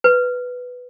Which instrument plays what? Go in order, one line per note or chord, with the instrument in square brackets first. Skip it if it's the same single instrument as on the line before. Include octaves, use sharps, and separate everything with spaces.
[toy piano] B4